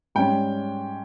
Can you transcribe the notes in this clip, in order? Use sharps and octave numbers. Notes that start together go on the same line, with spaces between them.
G#2 G3 C#4 G5